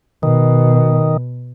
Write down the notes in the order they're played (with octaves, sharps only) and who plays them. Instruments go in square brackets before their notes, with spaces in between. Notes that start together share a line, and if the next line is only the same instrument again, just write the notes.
[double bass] B2 [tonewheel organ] D#3